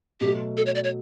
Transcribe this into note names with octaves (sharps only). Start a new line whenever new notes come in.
B2 F#3 A3 G4
A4
C#5
D5
C#5